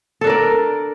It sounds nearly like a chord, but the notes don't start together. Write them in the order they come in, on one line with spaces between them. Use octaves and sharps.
A4 D4 A#4 D5